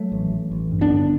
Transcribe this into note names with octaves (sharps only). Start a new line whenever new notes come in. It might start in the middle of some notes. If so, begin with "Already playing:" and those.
Already playing: F#3 A3
A1
A1
A1
G2
B3 D4
D3